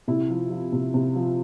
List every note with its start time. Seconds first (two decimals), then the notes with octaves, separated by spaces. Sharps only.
0.08 C3 E4
0.30 F3
0.50 F3
0.72 C3
0.94 C3
1.15 F3